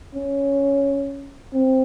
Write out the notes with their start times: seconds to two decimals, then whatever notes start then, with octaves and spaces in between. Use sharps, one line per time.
0.15 C#4
1.54 C4